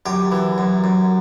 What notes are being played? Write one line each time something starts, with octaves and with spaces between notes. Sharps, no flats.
F#2 G4
E3
F#2
F#2